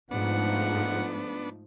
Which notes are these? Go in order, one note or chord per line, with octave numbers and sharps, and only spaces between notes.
G#2 F3 A3 B3 D4 D#4 F#5